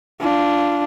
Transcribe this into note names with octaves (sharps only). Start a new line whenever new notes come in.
D4 F4